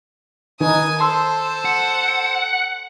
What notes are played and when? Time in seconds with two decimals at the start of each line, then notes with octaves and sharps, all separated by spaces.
0.61 D#3 D#4 B4 G#5 D#6
1.00 A4 C5 A5 C6 E6
1.65 F#5